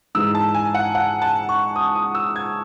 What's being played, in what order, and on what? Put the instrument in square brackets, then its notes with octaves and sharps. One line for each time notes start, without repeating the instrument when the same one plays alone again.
[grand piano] G#2 E3 G#3 E6
A5
G#5
F#5
F#5
A5
C#6
D#6
D#6
E6
G#6